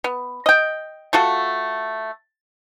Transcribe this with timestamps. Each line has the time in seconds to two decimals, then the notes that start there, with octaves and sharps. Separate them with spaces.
0.04 B3
0.46 D#5 G5
1.13 A3 F4 F#4 A4